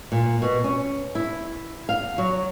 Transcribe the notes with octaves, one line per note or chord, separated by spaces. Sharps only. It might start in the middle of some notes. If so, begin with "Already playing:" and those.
A#2
B2
C#4
E4
F5
F#3